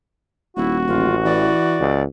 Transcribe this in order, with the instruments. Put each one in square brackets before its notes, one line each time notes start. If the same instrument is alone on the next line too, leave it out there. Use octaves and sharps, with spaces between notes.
[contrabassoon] D#1 [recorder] E4 [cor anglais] F#4
[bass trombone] A1 [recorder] F4
[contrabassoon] E3 [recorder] D5
[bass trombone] C#2